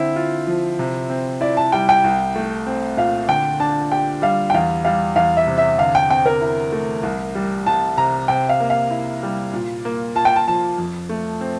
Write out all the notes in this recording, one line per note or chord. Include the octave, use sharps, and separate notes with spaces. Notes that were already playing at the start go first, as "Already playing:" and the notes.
Already playing: D3 C4 E4
F4
F3
C3
C4
E4 D5
A5
G3 G5
G5
C2
A3
C4
A#2 F5
D3 G5
D4 A5
G4 G5
G3 F5
G5
E2 F5
G3 F5
E2 F5
E5
C3
E5
D3 F5
G5
C4 G5
A#4
E4
A3
C2
G3
C2 A5
C3 A#5
C3 G5
F5
A#3
F5
E4
G3
A#2
A#3
F4 A5
G5
A5
F3 A5
F2
A3
C4